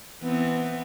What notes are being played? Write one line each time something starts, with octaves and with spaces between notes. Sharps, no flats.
E3 B3 C4